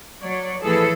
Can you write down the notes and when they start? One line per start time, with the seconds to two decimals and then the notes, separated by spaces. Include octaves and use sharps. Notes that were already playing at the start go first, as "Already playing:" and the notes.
0.21 F#3 C#5 D5
0.61 A2 E3 F3 G#4 A4